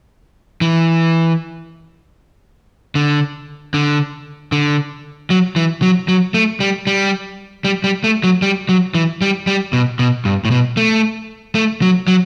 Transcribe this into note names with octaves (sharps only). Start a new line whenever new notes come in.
E3
D3
D3
D3
F#3
E3
F#3
F#3
A3
G3
G3
G3
G3
A3
F#3
G3
F#3
E3
G3
G3
B2
B2
G2
A2
B2
A3
A3
F#3
F#3